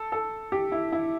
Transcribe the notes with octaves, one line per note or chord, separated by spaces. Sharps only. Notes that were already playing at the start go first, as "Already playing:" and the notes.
Already playing: A4
A4
G4
E4
E4